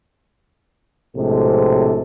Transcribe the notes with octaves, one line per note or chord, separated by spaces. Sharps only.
A#1 A2 C3 G#3 F#4 A4